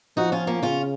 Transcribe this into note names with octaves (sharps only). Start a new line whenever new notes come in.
F3 D#4 F#4
C#4 F4
A#3 C#4
C#3 C#4 F4